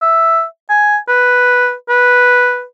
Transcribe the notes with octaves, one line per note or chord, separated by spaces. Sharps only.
E5
G#5
B4
B4